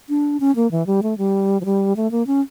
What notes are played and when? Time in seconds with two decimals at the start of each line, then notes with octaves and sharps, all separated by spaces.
0.09 D4
0.40 C#4
0.56 A#3
0.71 E3
0.87 G3
1.03 A3
1.18 G3
1.61 F3
1.65 G3
1.96 A3
2.11 A#3
2.27 C#4